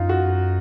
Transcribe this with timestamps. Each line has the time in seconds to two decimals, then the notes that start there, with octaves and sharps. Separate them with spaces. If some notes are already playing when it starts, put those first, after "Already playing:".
Already playing: F#2 D#4 F4
0.09 F#4